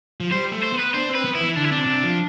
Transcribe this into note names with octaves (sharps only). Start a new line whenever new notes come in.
F3
G3 C5
A3
C5
B3
B4
D4 C5
C4
B4
B3
E4
E3
D3 D4
E4
C3 D4
C3
F3